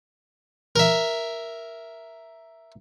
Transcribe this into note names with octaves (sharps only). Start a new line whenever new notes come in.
A#4 E5